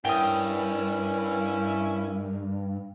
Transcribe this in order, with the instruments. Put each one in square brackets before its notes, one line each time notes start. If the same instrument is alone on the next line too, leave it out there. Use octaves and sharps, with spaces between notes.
[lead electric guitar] G2 [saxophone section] C#4 E4 [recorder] A#4 [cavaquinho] G5 D#6